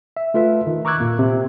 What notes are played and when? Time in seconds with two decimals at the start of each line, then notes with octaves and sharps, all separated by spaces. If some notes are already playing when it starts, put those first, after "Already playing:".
0.17 E5
0.34 A3 F4 B4 E5
0.67 D#3
0.85 A#5 C#6 D6 E6 F#6 G#6
1.00 A#2 A#3
1.19 C3